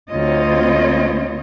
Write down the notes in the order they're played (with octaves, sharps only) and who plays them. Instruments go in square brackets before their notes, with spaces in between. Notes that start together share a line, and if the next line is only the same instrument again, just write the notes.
[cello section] D2 C4 F4 C#5 D#5